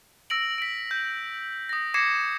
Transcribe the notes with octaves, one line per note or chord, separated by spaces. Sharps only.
E6 A#6 D7 F#7
B6 D7
G6
D#6 A#6
D6 G#6 A#6 C7 C#7 E7